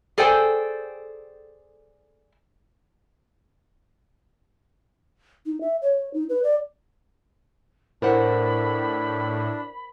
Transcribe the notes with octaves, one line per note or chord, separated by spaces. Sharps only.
G#4 A4 C5 D5 G5 G#5
D#4
E5
C#5
D#4
B4
D5
A2 D4 A#4 C5 F#5 B5